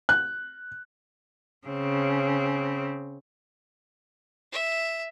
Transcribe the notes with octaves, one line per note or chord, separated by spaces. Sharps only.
F#6
C#3 C4
E5